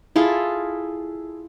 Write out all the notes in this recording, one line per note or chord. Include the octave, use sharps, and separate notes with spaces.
E4 F4 G#4 A4